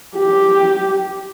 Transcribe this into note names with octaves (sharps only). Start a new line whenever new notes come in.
G4